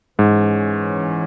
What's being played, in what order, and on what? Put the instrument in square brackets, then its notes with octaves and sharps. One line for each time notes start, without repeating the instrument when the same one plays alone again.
[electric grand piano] G#2 [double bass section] E3 C#4